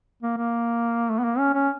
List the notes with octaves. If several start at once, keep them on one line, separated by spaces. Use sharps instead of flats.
A#3
A#3
A3
B3
A#3
C#4
C#4